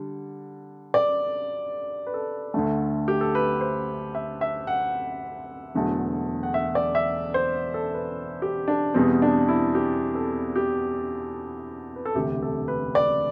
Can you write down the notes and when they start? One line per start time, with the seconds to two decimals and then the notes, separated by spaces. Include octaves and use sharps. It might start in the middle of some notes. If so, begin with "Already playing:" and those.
Already playing: D3 G3
0.94 D5
2.06 B4
2.14 A4
2.54 D2 D3 A3
3.08 G4
3.21 A4
3.35 B4
3.61 C5
4.15 E5
4.41 E5
4.67 F#5
5.74 E1 E2 D3 F#3 A3
6.43 F#5
6.54 E5
6.75 D5
6.95 E5
7.34 C5
7.74 A4
7.94 B4
8.42 G4
8.68 D4
8.94 E2 B2 G3 C4
9.22 D4
9.48 E4
9.75 G4
10.15 A4
10.56 G4
11.96 B4
12.05 A4
12.15 E1 D2 C3 G4
12.42 A4
12.68 B4
12.95 D5